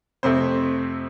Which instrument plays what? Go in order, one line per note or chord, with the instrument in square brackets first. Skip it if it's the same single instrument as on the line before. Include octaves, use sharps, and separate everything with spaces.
[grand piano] F2 C3 A3 C4 C5